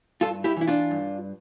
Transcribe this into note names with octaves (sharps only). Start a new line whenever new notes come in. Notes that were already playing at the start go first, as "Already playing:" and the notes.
G2 F4 A4
E4 G4
E3 E4
D4 F4
G2